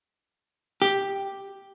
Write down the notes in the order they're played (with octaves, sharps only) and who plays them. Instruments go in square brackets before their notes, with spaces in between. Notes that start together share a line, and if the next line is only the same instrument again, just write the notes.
[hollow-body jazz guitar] G4